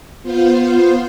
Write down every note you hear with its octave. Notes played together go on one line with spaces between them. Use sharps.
B3 F4 C5